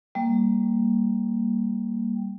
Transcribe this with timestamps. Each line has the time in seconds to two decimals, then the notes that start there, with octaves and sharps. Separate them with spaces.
0.15 G3 A#3